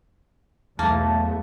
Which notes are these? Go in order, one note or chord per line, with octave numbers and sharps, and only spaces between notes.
B1 E2 A3 A#3 A5